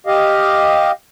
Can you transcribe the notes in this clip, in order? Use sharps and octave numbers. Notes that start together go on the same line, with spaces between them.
G4 D#5 F5